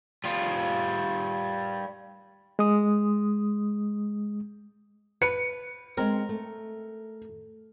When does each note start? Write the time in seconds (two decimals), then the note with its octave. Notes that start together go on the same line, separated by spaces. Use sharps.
0.24 G3 F4
2.59 G#3 D#6
5.22 B4 C#7
5.98 G#3 C4 A#4
6.29 A3